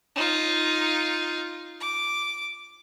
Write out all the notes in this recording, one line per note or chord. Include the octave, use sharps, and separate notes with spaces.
D#4 F4
D6